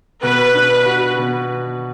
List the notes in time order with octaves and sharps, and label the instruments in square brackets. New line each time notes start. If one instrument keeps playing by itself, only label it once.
[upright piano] B2 [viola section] B4
[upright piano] D4
F#4
B2